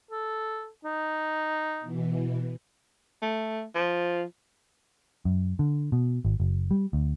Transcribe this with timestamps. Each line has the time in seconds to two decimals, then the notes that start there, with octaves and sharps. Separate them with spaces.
0.11 A4
0.85 D#4
1.81 B2 E3
3.22 A3
3.75 F3
5.25 F#2
5.59 D3
5.92 B2
6.25 G#1
6.40 F#1
6.71 G3
6.93 D2